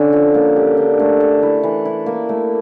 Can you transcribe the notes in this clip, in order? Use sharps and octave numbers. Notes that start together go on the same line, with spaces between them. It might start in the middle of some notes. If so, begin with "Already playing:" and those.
Already playing: D3 C#4
F3
A#3
G4
D4
A3
A4
E4
E3
E4
A#3
A3